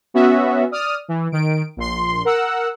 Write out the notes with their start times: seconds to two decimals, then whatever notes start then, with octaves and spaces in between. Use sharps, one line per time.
0.14 B3 C#4 F#4 E5
0.71 D5 D#6 F6
1.08 E3
1.32 D#3 D7
1.77 A#1 C6
2.25 A#4 F#5 E6